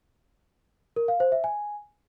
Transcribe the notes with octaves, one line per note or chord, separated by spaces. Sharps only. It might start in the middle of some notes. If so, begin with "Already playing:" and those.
A#4
F5
C5
E5
G#5